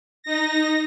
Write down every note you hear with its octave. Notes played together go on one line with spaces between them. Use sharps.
D#4 A#6